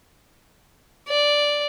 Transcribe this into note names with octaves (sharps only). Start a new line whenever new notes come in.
D5